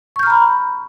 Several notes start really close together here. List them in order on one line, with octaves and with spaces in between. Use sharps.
C#6 G6 F6 A#5 B5